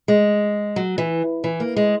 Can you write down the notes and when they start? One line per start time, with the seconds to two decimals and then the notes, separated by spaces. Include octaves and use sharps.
0.08 G#3
0.76 F#3
0.98 E3
1.44 E3
1.60 A#3
1.76 G#3